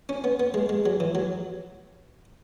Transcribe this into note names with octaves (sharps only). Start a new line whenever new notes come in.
C#4
B3
B3
G#3
G#3
F#3
E3
F#3